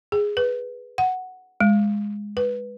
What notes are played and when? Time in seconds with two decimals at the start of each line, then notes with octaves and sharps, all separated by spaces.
0.12 G#4
0.37 B4
0.98 F#5
1.61 G#3
2.37 B4